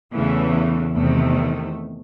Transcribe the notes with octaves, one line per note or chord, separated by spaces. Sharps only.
E2 C#3 E3 A3
A3
E2 C3 D#3 A3